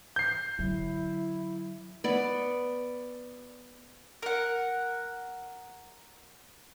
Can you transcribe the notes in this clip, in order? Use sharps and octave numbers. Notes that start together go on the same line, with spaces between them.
G6 C7
D3 F#3 E4
B3 D5
A#4 F#5